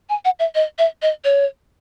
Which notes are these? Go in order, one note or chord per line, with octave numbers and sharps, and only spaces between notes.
G#5
F#5
E5
D#5
E5
D#5
C#5